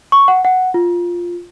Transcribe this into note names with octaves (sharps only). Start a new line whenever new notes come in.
C#6
F#5
F#5
F4